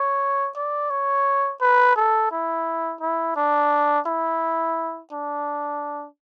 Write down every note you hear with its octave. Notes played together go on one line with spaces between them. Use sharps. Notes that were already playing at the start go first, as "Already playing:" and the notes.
Already playing: C#5
D5
C#5
B4
A4
E4
E4
D4
E4
D4